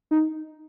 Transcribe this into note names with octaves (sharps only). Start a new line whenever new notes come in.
D#4